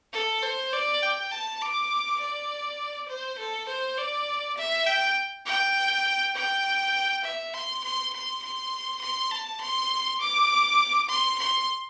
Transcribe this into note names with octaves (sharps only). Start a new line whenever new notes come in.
A4
C5
D5
G5
A5
D6
D5
C5
A4
C5
D5
E5
G5
G5
G5
E5
C6
C6
C6
C6
C6
A5
C6
D6
C6
C6